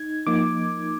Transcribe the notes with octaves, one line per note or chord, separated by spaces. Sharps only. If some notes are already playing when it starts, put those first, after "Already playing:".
Already playing: D#4 G#6
F3 A#3 D#4 D6